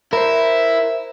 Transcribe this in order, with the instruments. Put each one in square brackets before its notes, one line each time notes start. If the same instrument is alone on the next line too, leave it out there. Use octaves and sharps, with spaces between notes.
[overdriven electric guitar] E4 [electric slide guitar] A#4 C5